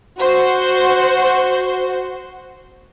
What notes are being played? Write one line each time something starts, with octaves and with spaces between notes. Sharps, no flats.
F#4 C5